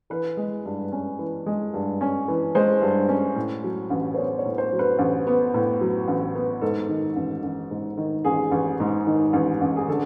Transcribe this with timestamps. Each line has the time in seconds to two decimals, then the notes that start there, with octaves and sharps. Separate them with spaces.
0.10 E3 B4
0.37 G#3
0.65 G2
0.92 C#4
1.19 E3
1.46 G#3
1.74 G2
2.01 C#4
2.28 E3
2.55 G#3 C5
2.82 G2
3.09 C#4
3.36 A2
3.64 F#3
3.90 A1
4.14 C5
4.18 B3 C#5
4.39 C#5
4.45 A2
4.58 C5
4.73 F#3
4.79 B4
4.99 A1
5.27 B3
5.54 A2
5.81 F#3
6.08 A1
6.35 B3
6.61 G#2 A4
6.89 D#3
7.16 A1
7.43 A1
7.71 G#2
7.98 D#3
8.25 A1 G#4
8.51 A1
8.80 G#2
9.07 D#3
9.33 A1
9.61 A1
9.76 G#4
9.88 D3 A4